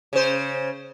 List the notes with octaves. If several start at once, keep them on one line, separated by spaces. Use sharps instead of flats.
C#3 C5